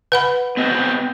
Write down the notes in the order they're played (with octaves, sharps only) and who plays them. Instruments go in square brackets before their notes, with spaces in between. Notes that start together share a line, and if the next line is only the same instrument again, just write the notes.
[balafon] B4 F#5 B5
[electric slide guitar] B3 C4 D#5